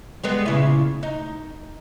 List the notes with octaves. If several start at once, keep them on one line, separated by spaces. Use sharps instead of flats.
G3 G#3 B3
A#2 C#3 E4
D#4